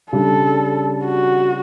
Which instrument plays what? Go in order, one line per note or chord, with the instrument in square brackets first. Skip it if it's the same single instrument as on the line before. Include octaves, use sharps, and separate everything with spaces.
[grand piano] C#3 G3 D4 [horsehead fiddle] A4
[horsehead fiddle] F#4